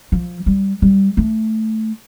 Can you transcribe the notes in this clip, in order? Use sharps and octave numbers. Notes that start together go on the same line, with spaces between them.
F3
G3
G3
A3